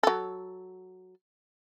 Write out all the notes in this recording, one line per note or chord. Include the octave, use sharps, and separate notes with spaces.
F#3 A4